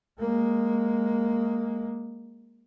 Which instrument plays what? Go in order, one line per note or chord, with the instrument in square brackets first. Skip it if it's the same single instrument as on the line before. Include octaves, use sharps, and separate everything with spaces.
[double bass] G#3 A#3